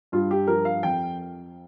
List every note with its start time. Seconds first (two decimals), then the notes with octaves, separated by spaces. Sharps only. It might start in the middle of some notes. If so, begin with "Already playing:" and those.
0.12 G2 F4
0.31 G4
0.47 F3 A#4
0.65 F5
0.83 F2 G5